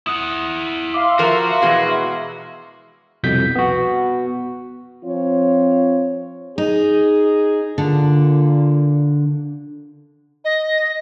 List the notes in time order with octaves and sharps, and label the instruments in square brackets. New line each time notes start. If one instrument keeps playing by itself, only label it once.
[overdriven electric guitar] E4 F#5 [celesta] D#6
[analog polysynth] E5 F5 C6 [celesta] D6
[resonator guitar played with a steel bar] F3 A#4 [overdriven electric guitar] F#4
[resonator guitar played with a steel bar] E2 B2 G#3
[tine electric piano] C2 F2 B2 G6 B6
B3 F#4
[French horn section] F3 C4 F4 C#5
[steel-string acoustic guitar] D#4 [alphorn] G#4
[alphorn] A#2 [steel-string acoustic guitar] D3
[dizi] D#5